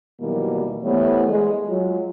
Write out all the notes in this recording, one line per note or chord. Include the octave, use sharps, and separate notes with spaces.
D#2 B2 E3 F#3 G3 A#3
E3 G3 A3 B3 C5 C#5
G#3
F#3 G#3 F4